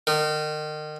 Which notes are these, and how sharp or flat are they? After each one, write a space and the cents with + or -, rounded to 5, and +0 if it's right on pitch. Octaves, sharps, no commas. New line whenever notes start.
D#3 -30